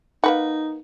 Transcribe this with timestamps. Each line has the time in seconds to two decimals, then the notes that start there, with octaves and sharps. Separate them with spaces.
0.24 A#3 D#4 B4 F#5